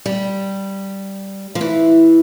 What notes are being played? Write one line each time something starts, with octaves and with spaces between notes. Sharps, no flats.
G3
F3
E3